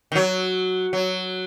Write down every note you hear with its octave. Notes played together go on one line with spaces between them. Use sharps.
D#3
F#3
F#3